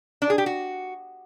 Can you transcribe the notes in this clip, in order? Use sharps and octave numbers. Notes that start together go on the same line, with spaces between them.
D4
G#4
G4
F#4